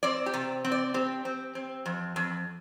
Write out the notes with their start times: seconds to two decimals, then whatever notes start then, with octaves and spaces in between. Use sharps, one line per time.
0.03 C4 D5
0.26 G4
0.34 C3
0.65 C4
0.72 D5
0.94 C4 G4
1.25 C4
1.55 C4
1.86 F2
2.16 F2